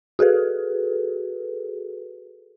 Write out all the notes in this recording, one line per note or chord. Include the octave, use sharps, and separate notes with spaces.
F#4 G#4 A4 B4